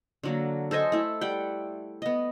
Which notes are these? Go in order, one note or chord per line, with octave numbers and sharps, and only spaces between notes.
D3 F#3 A#3
A4 C5 D#5 G#5
A3 E4
G3 F#5 G5
B3 D#5